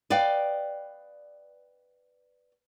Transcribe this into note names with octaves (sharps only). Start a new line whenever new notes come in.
B4 D5 D#5 F5 G5